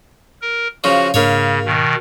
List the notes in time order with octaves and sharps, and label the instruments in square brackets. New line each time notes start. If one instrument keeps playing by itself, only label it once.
[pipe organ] A#4
[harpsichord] C#3 F3 [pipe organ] F#4
[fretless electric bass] G#2 D4 [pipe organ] C#3 [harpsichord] A#3 C#5
[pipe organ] B2 D#3